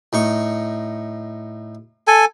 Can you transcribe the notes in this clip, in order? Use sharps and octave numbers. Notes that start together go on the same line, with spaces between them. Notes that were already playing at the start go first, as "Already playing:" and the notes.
A2 D#4 C#6
A4 G#5